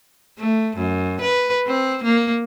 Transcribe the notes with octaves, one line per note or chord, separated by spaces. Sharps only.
A3
F#2
B4
C4
A#3